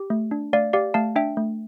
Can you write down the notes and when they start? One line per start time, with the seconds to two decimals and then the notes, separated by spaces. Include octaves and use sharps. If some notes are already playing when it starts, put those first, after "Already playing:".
Already playing: G4
0.10 A3
0.31 D4
0.53 A3 D5 F5
0.73 G4 D5 F5
0.94 A3 F5 A5
1.16 D4 E5 G5
1.37 A3